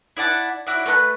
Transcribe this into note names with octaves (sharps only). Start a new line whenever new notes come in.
E4 D5 F#5 A5
E4 F#4 C#5 D5
A3 B4 A#5 F#6